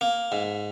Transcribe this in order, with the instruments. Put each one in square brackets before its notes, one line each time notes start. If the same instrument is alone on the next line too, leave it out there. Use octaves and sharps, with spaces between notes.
[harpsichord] A#3
G#2